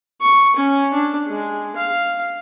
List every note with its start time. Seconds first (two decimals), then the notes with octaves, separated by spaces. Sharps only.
0.21 C#6
0.56 C#4
0.93 D4
1.27 G#3
1.76 F5